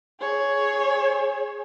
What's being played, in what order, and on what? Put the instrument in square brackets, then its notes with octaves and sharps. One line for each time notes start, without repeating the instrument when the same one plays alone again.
[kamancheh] G#4 C#5